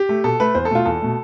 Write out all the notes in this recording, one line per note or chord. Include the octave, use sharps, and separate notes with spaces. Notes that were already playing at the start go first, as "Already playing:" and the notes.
Already playing: G4
A3
B2 A4
A3 B4
E2 C5
A4
B2 A3 F4
E2 A4
B2 A3